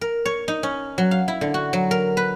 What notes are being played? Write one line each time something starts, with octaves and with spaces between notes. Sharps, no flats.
A#4
C#5
D#4
C#4
F#3
F5
E4
D3
F#4
F#3
A#4
B4